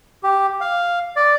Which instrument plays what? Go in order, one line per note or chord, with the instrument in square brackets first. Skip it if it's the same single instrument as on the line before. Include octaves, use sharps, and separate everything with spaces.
[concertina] G4
F5
D5